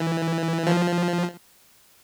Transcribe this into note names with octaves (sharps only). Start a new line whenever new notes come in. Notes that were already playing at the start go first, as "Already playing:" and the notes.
Already playing: E3
F3